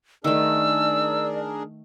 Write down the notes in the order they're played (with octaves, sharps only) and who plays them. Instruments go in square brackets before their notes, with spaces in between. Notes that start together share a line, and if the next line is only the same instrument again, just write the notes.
[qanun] D#3 A3 [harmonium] D4 G#4 A#4 [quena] D5 [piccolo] E6